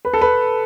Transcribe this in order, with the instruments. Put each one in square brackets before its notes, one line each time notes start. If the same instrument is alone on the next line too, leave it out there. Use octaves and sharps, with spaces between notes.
[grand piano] B4
A4
B4